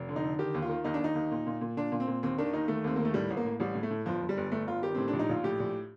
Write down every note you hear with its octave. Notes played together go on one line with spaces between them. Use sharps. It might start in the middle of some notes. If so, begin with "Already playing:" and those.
Already playing: F1
D3
D#4
D3
D#3 G4
D#2
F4
D#3
D#2 D#4
D4
D#2 D#4
D#2
A#2
A#2
A#2
A#2 D4
A#2
C4
A#2
D#2 C4
D#3 D4
D#2 D#4
D#3 A3
D#2 C4
D#3 A#3
A3
A2 G3
A1
A#3
A2
A1 G3
A2
A3
A2
G1 F3
G1
G3
G1
G1 A3
G1 F4
D#3 G4
A2 C4
D4
A#1
D#4
A#1 F4
A2 G4
A#1